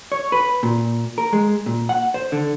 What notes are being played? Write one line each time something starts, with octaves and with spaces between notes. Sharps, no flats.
C#5
B4
A#2
A#4
G#3
A#2
F#5
C5
D3